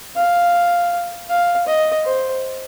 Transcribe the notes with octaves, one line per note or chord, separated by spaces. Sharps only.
F5
F5
D#5
C5